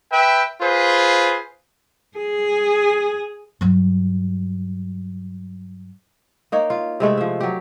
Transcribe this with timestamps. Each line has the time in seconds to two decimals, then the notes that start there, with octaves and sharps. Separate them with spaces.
0.12 B4 E5 G5
0.61 F4 G#4 B4 C5
2.18 G#4
3.61 G2 F#3
6.52 A#3 D#4 C#5
6.70 F4
7.00 C3 G#3 A3 A4
7.17 F3 E5
7.40 F#3 G4